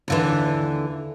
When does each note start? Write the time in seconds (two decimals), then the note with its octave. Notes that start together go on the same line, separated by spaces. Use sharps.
0.08 D#2 D3 E3